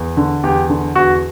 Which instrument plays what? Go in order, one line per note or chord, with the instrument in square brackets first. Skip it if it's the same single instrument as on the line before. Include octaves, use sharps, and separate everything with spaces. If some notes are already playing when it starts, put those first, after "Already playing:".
Already playing: [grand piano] E2
D3
E2 G4
D3
E2 F#4